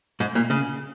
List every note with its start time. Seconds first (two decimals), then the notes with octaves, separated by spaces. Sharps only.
0.20 G#2
0.35 A#2
0.50 C#3